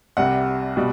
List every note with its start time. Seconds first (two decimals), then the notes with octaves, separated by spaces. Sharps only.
0.17 C2 C3 G3 F#5
0.77 B2 G3